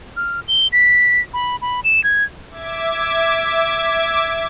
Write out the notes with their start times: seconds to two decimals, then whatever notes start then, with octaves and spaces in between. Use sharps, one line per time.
0.17 F6
0.48 G7
0.72 B6
1.34 B5
1.62 B5
1.84 E7
2.04 G#6
2.50 E5 D6 G#6